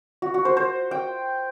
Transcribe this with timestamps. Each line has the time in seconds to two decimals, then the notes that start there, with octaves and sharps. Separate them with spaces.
0.22 F#4
0.34 F#4
0.45 C5
0.57 C5
0.91 G5